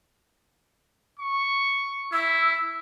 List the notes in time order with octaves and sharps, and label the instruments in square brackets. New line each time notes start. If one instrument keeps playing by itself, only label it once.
[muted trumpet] C#6
[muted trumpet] E4 [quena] E6